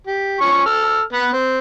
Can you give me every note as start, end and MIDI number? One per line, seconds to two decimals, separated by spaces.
0.07 0.39 67
0.41 0.62 53
0.41 0.62 61
0.41 0.62 85
0.66 1.02 69
0.66 1.02 88
0.66 1.02 89
1.13 1.29 59
1.13 1.29 71
1.13 1.29 78
1.33 1.59 60